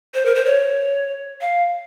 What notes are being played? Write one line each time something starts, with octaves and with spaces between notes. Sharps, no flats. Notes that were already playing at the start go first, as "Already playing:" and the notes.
C5
A#4
C5
C#5
F5